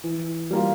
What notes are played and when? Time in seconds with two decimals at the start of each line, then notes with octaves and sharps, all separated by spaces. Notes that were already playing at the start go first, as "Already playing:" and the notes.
0.04 E3
0.51 G3 A#3 F4